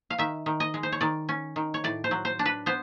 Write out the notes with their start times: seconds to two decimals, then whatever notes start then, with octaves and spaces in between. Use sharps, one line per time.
0.10 F5
0.18 D#3 E5
0.46 D#3
0.60 D#5
0.74 G#3
0.83 C5
0.92 C#5
1.01 D#3 D5
1.29 C#4
1.56 D#3
1.74 C#5
1.84 A2 D5
2.04 C5
2.11 F#3
2.25 C5
2.39 D4
2.45 B4
2.66 B3 C5